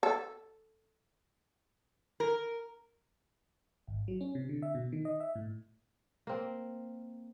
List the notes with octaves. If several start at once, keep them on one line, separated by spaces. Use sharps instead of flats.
A4
A#4
G#1
F#3
C#4
C3
D3
E5
B2
D#3
D#5
E5
A2
A#3 C4